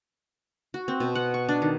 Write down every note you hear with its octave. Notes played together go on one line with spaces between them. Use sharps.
F#4
C4
B2
F#5
C#6
D4
D#3